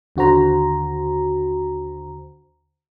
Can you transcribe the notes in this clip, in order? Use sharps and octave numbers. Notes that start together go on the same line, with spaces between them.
D#2 D3 F#4 C5 A#5